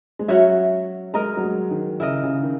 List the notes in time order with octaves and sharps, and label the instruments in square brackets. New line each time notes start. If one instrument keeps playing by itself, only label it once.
[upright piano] G#3
[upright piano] F#3 [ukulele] C#4 F#4 C#5 E5
[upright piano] G#3 [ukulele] A#4 D#5 A#5
[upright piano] F#3
G#3
D#3
[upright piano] C#3 [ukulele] E4 A#4 D#5
[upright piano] C#3
D#3